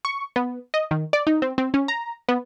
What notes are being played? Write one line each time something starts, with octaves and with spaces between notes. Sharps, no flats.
C#6
B3
D#5
D#3
D5
D#4
C4
C4
C#4
A#5
B3